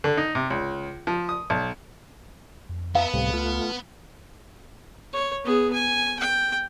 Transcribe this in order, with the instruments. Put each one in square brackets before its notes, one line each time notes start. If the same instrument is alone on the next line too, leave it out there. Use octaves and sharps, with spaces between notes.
[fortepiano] D3
D#4
C3
C#2
F3
D#6
B1
[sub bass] F2
[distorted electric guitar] B3 [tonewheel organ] B4 E5 A#5 [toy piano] F5 A5
[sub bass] C#2 [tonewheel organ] A2 C3 G3
[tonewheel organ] A3 F4
[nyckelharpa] C#5
B3 G#4
G#5
G5